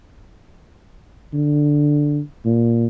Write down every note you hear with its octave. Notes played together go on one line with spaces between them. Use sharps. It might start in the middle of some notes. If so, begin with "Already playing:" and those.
D3
A#2